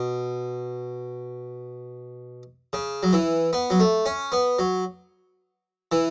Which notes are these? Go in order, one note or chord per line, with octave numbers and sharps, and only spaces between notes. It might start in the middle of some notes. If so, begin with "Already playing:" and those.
Already playing: B2
C#3
F#3
E3
B3
F#3
A3
C#4
B3
F#3
E3